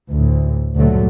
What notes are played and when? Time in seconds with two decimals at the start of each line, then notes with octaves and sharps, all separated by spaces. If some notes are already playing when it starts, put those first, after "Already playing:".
0.11 D2 A2
0.75 D2 G2 A#2 D3 F#3 A3